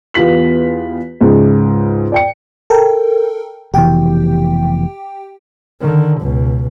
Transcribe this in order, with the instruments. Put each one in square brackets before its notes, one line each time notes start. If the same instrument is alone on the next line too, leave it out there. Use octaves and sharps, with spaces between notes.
[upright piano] E2 B3 F4 G4 B6 F#7
C#2 G#2 C#3
D5 G5 C#7
[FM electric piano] A4 A#4 G5
[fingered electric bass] F1 B2 E3 [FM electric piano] G4 G5
[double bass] D3 D#3
C#2 B2